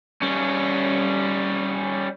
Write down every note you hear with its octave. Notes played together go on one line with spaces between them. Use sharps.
G3 C#4